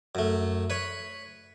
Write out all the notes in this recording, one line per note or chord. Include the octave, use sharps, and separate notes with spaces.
F#2 A3
B4 C#5